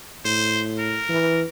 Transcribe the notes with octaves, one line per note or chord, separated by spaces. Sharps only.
A2 C5
A#4
E3